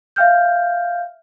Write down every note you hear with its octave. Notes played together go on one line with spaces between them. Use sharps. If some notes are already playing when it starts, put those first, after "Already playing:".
E5 F5 G5 F6 G6